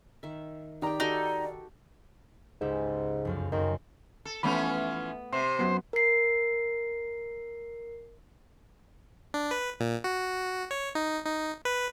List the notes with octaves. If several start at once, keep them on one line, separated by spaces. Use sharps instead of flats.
D#3 E5
D#3 G4 D5 G5 A#5
D#4 F#4 G4 A4
C#2 G#2 G4 E5
F1 F#2 F5
F#2 D#3 C4
A4
E3 F3 A3 B3 C#4 B5
C3 C5
F#2 F#3 B3
A#4 C7
D4
B4
A#2
F#4
C#5
D#4
D#4
B4